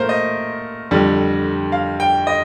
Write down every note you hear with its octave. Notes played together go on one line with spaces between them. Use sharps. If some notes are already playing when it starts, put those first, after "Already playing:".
Already playing: A#2 A3 A#4 C5
D#5
F2 D3 G3
F5
G5
D#5